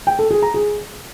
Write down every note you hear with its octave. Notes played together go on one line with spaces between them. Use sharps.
G5
A4
G#4
A#5
G#4